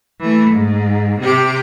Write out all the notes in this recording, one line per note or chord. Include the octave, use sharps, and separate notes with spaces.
E3 A3
G#2
C3 G4